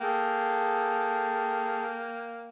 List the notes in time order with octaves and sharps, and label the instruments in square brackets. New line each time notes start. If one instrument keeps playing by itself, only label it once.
[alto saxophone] A#3 [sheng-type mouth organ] G#4 A4 [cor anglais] G5